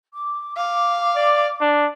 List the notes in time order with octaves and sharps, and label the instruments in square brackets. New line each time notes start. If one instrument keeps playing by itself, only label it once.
[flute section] D6
[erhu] F5 [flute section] D6
[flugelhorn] D5
D4